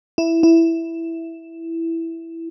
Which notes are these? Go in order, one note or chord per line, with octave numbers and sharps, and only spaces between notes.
E4
E4